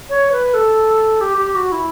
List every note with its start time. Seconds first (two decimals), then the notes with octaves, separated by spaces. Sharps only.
0.09 C#5
0.32 B4
0.54 A4
1.21 G4
1.37 G4
1.55 F#4
1.72 E4